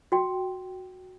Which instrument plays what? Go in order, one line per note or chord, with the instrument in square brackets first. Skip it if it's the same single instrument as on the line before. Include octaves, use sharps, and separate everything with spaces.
[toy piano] F#4 G5